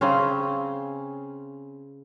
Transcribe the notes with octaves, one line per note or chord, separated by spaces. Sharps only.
C#3 C4 C#4